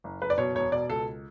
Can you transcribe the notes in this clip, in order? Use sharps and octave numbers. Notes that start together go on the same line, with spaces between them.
F#1
F#1 B4
D5
B2 C#5
E1 C#5
B2 D5
C#2 A4